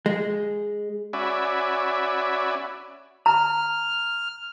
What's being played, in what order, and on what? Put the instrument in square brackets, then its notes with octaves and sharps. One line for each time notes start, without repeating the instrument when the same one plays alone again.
[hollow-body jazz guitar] G#3
[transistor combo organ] C#4 F#4 D5 E5 G#5 B5
[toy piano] A#5 [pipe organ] F6